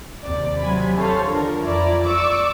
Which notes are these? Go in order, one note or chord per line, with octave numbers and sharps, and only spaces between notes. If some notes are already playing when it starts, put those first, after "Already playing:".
D#2 C3 D5
C3 F#3 G#5 B5
A4 C5 C#5 F5
D3 F3 A#4
F2 F3 E4 D5 A#5
D5 C#6 D6 E6